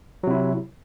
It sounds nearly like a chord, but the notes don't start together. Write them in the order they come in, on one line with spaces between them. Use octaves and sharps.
F#3 C3 E4